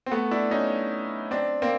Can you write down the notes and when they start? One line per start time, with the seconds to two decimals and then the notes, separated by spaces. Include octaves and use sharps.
0.06 C4
0.11 A3 B3
0.31 D4 E4
0.51 C#4 D#4
1.31 C4 D4
1.62 A#3 C4